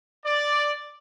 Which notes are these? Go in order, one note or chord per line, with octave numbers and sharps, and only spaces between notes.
D5